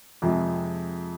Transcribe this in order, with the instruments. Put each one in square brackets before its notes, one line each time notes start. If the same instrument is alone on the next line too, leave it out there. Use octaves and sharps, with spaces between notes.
[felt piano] F2 C3 F3 G#3